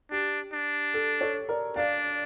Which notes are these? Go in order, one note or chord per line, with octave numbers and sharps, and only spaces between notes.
D4 G4
D4
A4
A4 C#5
A#4 D5
D4 D5 F5